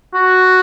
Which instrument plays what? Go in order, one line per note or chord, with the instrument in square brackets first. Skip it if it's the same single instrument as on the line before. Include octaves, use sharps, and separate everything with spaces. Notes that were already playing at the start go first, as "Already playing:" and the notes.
[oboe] F#4